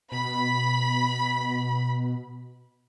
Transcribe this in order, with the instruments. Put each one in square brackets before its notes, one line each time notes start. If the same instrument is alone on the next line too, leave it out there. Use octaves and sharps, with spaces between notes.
[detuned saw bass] B2 [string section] B5